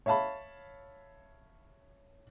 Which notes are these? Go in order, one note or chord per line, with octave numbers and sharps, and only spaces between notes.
C#5 E5 F5 A5 B5